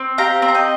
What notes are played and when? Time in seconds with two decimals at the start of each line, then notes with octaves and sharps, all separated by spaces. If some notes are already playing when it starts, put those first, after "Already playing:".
Already playing: C4
0.18 G4 F5 A#5
0.42 C4
0.48 A#5
0.55 D#5 G5